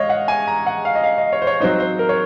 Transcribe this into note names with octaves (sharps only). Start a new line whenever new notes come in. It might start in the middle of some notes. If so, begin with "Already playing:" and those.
Already playing: G#3 C#5 D#5 F5
F#5
G#5
A#5
F#5
F5
D#5
F5
D#5
C#5
C5
C#5
F#3 C4 D#4 C5
C5
A#4
C#5